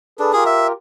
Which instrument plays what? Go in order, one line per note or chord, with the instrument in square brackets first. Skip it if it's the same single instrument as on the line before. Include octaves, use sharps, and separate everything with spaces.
[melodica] D4 [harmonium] G#4 A4 B4
[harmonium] F4 G4 A#4 [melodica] G#4
[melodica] E5